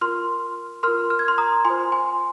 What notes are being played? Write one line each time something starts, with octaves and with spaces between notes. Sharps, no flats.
F4 A#4 C6 F6
F4 A#4 C6 F6
F6
G#6
C6 F6
A#5 D#6
F4 G#5 C6
C5
G#5 C6